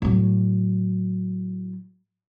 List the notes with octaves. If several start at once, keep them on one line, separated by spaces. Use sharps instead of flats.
A2 F#3